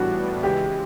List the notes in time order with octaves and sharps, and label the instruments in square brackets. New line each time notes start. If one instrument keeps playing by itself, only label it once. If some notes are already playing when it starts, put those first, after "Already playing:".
Already playing: [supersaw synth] A2 E3 G3 B3 D4 [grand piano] F#4
[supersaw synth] C#3 E3 G#3 [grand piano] G4